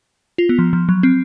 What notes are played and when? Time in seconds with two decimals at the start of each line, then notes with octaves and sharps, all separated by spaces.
0.38 F4
0.49 B3
0.59 F3
0.73 F3
0.89 F#3
1.03 C4